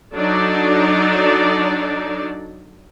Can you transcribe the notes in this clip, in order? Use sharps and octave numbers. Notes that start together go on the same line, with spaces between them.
F#3 D4 D#4 A4 D5